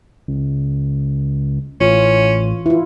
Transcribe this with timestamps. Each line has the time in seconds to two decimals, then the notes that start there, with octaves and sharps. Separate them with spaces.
0.28 C#2
1.81 A1 E3 C#4 F4
2.66 E3 E4 F4